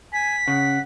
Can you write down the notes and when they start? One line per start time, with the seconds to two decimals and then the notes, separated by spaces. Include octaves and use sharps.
0.13 G#5 B6
0.48 C#3 F#5